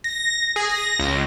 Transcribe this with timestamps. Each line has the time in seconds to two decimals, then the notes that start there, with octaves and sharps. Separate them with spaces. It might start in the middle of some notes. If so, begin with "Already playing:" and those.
0.04 A#6
0.56 G#4
0.69 A#6
0.99 C#2